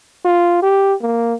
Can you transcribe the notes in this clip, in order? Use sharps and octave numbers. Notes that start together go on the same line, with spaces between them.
F4
G4
A#3